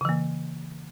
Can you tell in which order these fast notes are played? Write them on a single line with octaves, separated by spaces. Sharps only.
C#3 E3 A#3